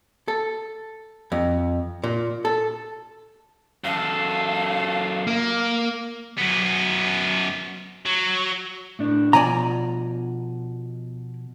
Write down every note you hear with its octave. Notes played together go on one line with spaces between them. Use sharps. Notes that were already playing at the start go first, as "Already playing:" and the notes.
A4
F2
A#2
A4
F#2 A4 F5
A#3
F#2 B3
F#3
A2 D4
B2 F3 D5 G#5 A#5